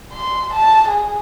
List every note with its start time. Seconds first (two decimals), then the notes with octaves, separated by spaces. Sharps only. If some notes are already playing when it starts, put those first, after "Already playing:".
0.13 C6
0.53 A5
0.88 G#4